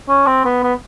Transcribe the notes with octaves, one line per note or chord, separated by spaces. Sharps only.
C#4
C4
B3
B3